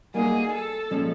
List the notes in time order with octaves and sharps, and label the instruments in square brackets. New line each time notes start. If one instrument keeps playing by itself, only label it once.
[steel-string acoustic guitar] G3 A#3 D#4 F#4 [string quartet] G#4
[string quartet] A4
[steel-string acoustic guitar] A#2 F3 G#3 C#4